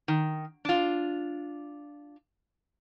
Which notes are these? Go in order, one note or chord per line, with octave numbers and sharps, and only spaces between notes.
D#3
D4 F4